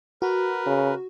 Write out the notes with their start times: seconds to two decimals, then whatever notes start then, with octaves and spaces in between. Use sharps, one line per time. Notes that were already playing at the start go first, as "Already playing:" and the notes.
0.22 F#4 A#4 B4
0.66 C#3